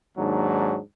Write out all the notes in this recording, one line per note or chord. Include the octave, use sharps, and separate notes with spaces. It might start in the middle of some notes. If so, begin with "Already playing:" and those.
D#2 G#2 F#3 D4